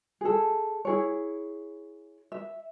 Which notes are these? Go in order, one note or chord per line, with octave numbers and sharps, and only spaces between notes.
G#4 A4
E4 G#4 C#5
E5